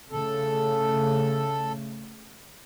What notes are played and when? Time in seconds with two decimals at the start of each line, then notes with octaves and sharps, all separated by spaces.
0.11 C#3 A3 A4